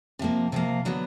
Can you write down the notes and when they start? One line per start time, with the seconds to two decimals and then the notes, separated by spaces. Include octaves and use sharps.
0.19 C3 F3 A#3
0.52 C3 F3 A#3
0.85 D3 F#3 B3